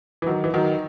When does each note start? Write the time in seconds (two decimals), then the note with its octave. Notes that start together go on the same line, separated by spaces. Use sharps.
0.22 E3
0.26 D#3 F#3
0.44 E3
0.54 D#3 F#3